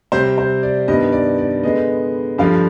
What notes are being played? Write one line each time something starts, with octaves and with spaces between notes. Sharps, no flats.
C3 G3 C4 C5
C5
D5
G2 D#3 B3 D#5
D5
D5
D3 G#3 B3 D#5
G2 D3 F3 F5